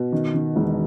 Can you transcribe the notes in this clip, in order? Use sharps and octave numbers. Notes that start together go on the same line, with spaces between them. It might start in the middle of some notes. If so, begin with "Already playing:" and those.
Already playing: B2
D#3
D#3
E1